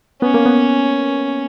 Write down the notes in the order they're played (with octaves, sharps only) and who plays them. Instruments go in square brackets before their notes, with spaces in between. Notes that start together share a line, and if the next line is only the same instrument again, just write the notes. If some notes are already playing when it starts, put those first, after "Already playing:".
[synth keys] B3 [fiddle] C#4
[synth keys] A#3
B3